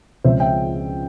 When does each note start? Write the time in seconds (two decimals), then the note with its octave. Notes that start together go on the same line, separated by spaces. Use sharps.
0.24 C#2 C#3 F3 C4 C5 E5
0.40 E5 G5